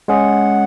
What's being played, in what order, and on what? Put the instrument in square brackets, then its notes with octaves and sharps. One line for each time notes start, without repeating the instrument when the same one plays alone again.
[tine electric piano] G#3 C#4 G#4 [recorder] F#5